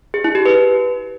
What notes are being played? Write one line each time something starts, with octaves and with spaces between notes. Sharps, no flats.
G#4
E4
G4
B4